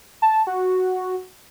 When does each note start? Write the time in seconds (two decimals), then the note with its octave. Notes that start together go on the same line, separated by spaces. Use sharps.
0.22 A5
0.47 F#4